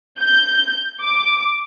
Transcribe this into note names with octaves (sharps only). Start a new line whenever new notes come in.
G6
D6